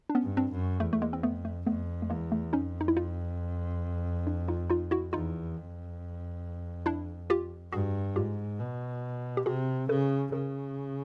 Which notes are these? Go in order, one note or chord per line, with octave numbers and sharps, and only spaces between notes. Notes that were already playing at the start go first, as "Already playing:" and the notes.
D4
B3 C#4
G2
C4 D4
F#2
E2 A3
A3
G#3 A#3
C4
F2 A3 B3
A3
F2 A3 B3
A3
E2 G#3 A#3
A3
F2 C#4 D#4
D#4
E4
D#4 F4
D4 E4
D#4 F4
D#4 F4
E4 F#4
E2 D#4 F4
F2
D4 E4
F4 G4
G2 F#4 G#4
G#2 F4 G4
B2
G4
C3 F#4 G#4
C#3 A4 B4
C#3 G#4 A#4